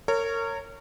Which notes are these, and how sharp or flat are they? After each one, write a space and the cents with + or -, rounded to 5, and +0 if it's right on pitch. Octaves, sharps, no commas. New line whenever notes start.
A#4 -30 C#5 +0